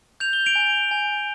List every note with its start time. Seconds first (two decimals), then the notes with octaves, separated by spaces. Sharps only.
0.20 G6 F7
0.33 G7
0.46 D7 F7
0.55 G#5
0.91 G#5